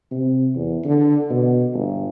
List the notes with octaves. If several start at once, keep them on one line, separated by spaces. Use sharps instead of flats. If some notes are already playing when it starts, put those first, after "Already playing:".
C3
E2
D3
B2
G1